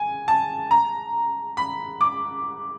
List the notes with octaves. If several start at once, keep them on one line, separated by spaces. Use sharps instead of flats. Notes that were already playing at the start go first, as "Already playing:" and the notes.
Already playing: G#5
A5
A#5
B5
D6